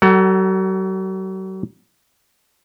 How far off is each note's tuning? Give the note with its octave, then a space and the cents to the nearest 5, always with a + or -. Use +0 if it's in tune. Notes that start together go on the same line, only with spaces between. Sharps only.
F#3 +40 A4 +35 F#5 +20